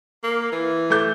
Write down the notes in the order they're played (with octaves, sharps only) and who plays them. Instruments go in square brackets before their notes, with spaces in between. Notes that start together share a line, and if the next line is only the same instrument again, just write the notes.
[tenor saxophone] A#3
E3
[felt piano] A3 D6 G6